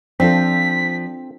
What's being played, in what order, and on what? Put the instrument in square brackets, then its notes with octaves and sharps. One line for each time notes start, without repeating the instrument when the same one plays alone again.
[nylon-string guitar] F3 [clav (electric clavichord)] C4 [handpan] D4 F4 A4 [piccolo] B6